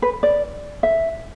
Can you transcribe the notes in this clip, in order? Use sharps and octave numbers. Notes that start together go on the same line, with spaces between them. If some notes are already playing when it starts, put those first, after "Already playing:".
B4
D5
E5